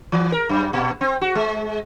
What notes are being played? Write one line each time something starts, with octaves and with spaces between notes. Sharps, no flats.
E3
A#4
F#2
A#2
C4
F#4
G#3